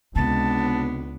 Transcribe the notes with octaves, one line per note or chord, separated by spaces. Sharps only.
C#2 C3 B3 D4 A5